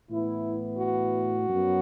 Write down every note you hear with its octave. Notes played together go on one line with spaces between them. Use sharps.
A2 E3 B3 E4
F#4
F#2 F#3 B3